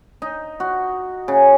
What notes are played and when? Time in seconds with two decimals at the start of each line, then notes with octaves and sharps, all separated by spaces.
0.22 D#4
0.60 F#4
1.28 C#3